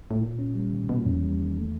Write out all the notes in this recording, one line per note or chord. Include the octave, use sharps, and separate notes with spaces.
A2
A#2 A#3
C#4
G3
D#3
B2 A#3
A#2
F2 C#4
E2
G3
D#3
A3